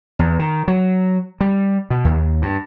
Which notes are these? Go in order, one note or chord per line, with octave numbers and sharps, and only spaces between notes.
E2
D#3
F#3
G3
B2
D#2
G2